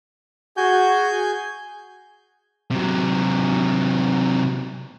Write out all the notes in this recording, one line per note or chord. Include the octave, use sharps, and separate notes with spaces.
F#4 G#4 G#5 G6
C3 F#3